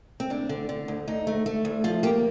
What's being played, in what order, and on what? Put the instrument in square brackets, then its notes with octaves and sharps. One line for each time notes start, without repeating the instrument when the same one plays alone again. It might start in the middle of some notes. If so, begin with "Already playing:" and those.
[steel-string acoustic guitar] C4
D2 D4
D3
D3
D2
D2 D#4
A3
A3
D2
F3 F4
A#3 G4